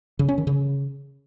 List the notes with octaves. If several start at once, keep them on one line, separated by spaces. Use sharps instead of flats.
C#3
C#4
D#3
C#3